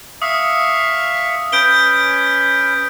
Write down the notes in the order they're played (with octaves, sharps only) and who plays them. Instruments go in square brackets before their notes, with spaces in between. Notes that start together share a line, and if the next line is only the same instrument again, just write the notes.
[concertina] E5 F5 C#6 [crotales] D#6
[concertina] C#4 B4 [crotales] G6 D7 G7